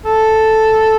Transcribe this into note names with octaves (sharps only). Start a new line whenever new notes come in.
A4